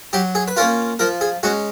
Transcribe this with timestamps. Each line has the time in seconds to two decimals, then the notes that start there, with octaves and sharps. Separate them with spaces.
0.13 F#3 G4
0.35 G#4
0.48 B4
0.56 A#3 C#4 F4 A#4
0.99 F3 A#4
1.21 G#4
1.43 G#3 C#4 F#4